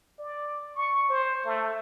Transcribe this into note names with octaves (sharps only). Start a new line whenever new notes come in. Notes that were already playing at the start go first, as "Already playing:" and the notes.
D5
C#6
C5
A3